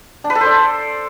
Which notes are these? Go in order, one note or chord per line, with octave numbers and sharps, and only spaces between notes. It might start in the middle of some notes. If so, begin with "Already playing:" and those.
D4
B4
A4
C5
D5